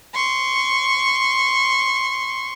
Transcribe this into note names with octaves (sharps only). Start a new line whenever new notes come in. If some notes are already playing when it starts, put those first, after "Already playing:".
C6 C#6